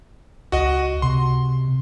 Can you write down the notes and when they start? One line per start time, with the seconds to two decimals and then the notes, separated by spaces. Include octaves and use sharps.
0.52 C#2 F#4 D#5 F#5
1.02 C3 C6